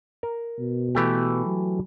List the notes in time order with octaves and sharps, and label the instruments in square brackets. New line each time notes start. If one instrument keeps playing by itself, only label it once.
[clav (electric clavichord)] A#4
[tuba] B2
[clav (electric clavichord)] E3 A3 G4
[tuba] F#3